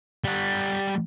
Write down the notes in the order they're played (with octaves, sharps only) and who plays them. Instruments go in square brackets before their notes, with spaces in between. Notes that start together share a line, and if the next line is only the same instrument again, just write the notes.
[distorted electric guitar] G3 F#5